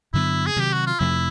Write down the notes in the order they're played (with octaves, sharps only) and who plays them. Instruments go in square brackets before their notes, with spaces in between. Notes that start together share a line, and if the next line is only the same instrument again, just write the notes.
[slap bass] G2 D3 F#3 B3 [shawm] E4
[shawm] G#4
[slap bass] C3 D#3 F#3 [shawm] G4
[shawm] F#4
F4
[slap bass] F2 C3 F3 A3 [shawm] E4